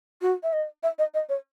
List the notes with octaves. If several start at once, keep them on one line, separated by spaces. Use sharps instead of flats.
F#4
E5
D#5
E5
D#5
D#5
C#5